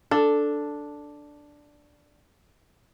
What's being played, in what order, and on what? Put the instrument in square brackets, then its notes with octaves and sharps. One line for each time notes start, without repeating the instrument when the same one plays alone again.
[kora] D4 [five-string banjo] A4